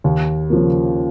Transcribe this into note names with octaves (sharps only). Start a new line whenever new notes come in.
D#2
C#3 F3 A#3